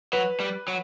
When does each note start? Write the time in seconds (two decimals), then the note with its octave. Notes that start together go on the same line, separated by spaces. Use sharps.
0.13 F#3 B4
0.40 G3
0.68 F#3